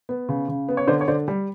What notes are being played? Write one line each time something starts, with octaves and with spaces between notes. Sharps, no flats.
B3
C#3
C#3
B3
C#5
D3 C5 D5
C#5
D3 C5 D5
G3